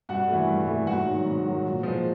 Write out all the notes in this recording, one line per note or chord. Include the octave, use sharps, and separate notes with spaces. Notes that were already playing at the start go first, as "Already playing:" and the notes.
G2 F#4 F#5
E3 A3
G2
E3 A3
G#2 F#4 F#5
D#3 F#3
G#2
D#3 F#3
A#2
F3 G#3